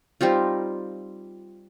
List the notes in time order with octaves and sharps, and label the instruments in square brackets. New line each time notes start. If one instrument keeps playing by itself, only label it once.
[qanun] G3 C4 D#4 F4